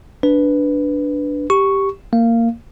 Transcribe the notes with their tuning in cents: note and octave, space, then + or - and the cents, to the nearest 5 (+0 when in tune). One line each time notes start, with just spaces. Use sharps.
D4 -5 B4 +0
G4 +0 C#6 +0
A#3 -15 F5 -15